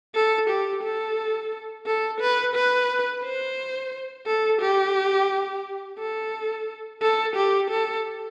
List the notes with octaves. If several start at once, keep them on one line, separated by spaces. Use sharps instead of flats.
A4
G4
A4
A4
B4
B4
C5
A4
G4
A4
A4
G4
A4